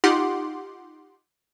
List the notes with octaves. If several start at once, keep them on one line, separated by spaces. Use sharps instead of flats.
D#4 F4 G4 F#5 C6 D6